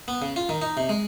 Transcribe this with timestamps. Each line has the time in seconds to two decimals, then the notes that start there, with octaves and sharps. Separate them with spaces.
0.08 B3
0.22 C#3
0.36 F4
0.49 D#3
0.62 D#4
0.77 C3
0.89 G#3